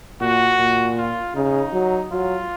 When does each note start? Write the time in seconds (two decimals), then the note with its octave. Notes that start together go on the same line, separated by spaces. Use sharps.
0.21 A#2 F#4
0.59 A#2
0.97 F4
1.35 C#3 D#4
1.73 F#3
2.11 F#3 F4